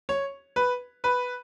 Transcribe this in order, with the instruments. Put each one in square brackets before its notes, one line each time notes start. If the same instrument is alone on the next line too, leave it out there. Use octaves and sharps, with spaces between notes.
[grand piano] C#5
B4
B4